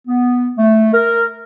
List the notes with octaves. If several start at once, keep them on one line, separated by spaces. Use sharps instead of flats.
B3
A3
A#4